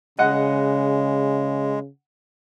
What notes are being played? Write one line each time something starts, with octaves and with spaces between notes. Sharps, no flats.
C#3 G#3 D#5 F#5